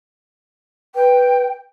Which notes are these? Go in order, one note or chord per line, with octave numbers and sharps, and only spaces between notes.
B4 G5